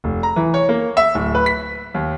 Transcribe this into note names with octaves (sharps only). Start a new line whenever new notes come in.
F1
A#5
E3
C#5
A#3
E5
D1
B4
B6
D#2